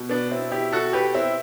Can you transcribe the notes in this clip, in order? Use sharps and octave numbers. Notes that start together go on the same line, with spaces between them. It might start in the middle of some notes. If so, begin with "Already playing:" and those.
Already playing: B2
B3 D4
C4 E4
E4 G4
F#4 A4
G4 B4
C4 E4